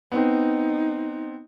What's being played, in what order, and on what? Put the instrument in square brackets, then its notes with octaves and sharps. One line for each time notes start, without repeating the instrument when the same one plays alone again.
[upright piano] B3 C4 [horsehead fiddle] D#4